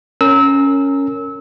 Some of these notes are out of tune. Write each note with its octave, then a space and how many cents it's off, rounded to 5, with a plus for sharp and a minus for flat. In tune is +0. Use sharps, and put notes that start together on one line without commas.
C#4 +0 A#4 -20 E6 -25